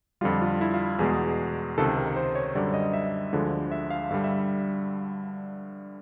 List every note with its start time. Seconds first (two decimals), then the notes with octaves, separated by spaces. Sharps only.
0.21 F2 D3 G3 F4
0.42 F4
0.61 E4
0.74 F4
0.99 E2 B2 G#3 G#4
1.78 C#2 C3 D#3 A4
1.97 A#4
2.16 C5
2.35 C#5
2.55 F#2 D3 G3 D5
2.74 D#5
2.93 E5
3.33 D2 D3 F3 G#3
3.72 E5
3.90 F5
4.11 G2 D3 G3 F5
4.24 E5